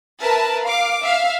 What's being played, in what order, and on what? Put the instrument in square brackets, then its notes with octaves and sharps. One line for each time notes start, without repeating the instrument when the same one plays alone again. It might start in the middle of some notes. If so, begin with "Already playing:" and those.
[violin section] A#4 B4 E5 A5
F5 D6
E5 F5